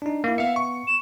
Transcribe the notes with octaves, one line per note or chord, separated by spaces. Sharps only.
D4 D#4
A#3 E4
B3 E5 F5 C#7
C#6
E7